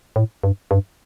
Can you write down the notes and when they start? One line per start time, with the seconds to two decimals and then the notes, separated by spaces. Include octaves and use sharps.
0.16 A2
0.44 G2
0.71 G2